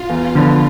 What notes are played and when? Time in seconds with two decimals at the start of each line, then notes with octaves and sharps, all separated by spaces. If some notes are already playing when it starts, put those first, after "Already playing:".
Already playing: F4
0.09 E2
0.35 D3 F3 B3